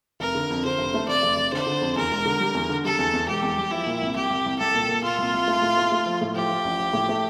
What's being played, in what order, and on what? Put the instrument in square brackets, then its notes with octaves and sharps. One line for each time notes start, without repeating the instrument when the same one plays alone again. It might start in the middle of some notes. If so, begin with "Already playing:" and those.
[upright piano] F1 [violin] A#4
[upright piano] D3
F2
[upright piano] D3 [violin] C5
[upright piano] F1
A3
[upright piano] F1 [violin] D5
[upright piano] F1
F1
[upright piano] D3 [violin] C5
[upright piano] D3
F2
[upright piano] E2 [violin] A#4
[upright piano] E1
D3
G3
E2
D3
[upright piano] G3 [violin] A4
[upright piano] E2
E2
[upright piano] E1 [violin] G4
[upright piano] E2
G3
[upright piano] F3 [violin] E4
[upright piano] A#2
C2
[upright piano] C2 [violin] G4
[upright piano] C2
C2
[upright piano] C2 [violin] A4
[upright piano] A#2
A#2
[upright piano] A#2 [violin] F4
[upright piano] C2
C2
A3
A2
A3
A3
F3
A2
[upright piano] F3 [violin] G4
[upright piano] F3
A1
F3
A2
A3